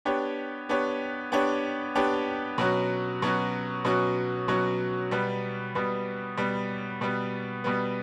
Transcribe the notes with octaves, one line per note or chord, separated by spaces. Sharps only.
B3 D4 G4 C#5
B3 D4 G4 C#5
B3 D4 G4 C#5
B3 D4 G4 C#5
B2 F#3 C#4 F#4
B2 F#3 C#4 F#4
B2 F#3 C#4 F#4
B2 F#3 C#4 F#4
B2 G3 B3
B2 G3 B3
B2 G3 B3
B2 G3 B3
B2 G3 B3